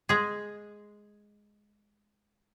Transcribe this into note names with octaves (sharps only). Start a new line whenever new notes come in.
G#3 G#4